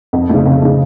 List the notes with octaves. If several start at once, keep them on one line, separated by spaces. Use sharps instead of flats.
F2
C#3 A3
F2
C#3 A3